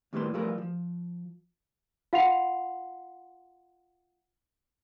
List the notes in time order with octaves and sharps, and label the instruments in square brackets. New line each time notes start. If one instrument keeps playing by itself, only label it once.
[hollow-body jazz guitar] D#2 A2 G3 A#3 B4 C6
F3 G3 A3 F4 A#4 B4
F3
[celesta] F4 F5 F#5 C6 C7 F7